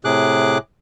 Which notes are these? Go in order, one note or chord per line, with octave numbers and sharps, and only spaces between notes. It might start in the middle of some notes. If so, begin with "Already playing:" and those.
A2 C3 G#4 D6 F#6